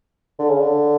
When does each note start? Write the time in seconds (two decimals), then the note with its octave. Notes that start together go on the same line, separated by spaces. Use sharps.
0.39 D3
0.50 C#3
0.61 D3